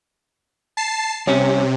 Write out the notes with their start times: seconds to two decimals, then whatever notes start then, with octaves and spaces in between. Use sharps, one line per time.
0.77 A5 C7
1.27 C2 C3 C#4 C#5